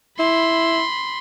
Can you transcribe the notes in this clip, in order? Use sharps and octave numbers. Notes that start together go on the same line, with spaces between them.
E4 B5 C6